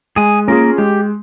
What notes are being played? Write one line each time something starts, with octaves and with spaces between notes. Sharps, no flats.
G#3 G#4 G#5
A#3 C#4 F4 G#4 A#4
G#3 G4